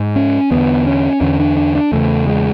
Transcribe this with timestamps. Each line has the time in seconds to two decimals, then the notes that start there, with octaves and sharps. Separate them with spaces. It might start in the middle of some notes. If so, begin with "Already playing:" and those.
Already playing: G#2
0.16 C#4
0.51 E2 D3 B3
0.87 C#4
1.21 E2 D3 C#4
1.40 D4
1.57 D4
1.75 D4
1.92 E2 C#3 A3
2.27 G#3